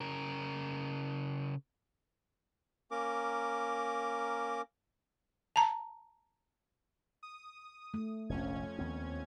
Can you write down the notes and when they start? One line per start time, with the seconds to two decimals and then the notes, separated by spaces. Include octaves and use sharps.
0.01 C#3 A#4
2.91 A#3 C#4 A#4 D6
5.56 A5 A#5
7.23 D#6
7.94 A3
8.29 F1 A#1 F2 C#4 G#6
8.79 D#2 B3 C4